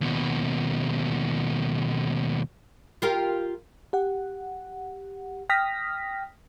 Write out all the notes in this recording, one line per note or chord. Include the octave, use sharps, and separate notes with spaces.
D#2 B2
F4 G4 A#4
G4 F#5
G5 D#6 F6 A#6 B6